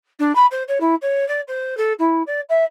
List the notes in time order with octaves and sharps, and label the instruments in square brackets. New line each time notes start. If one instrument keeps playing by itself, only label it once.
[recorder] D4
B5
C5
C#5
E4
C#5
D5
C5
A4
E4
D5
E5